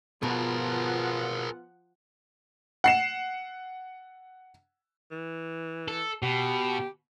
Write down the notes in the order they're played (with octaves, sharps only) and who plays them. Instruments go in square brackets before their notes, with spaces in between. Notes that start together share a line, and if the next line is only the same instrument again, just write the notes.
[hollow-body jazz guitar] B2 [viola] F3 F#5 [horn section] B3 F4 [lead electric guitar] G#4 A#4
[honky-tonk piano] F#5 C7 E7
[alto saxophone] E3
[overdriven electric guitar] A4
[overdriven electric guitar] B2 [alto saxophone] G4